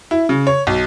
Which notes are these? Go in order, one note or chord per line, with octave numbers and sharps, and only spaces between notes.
E4
C#3
C#5
B1